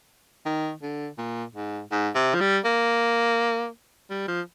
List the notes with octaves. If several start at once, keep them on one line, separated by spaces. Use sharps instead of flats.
D#3
D3
A#2
G#2
G#2
C3
F3
G3
A#3
G3
F3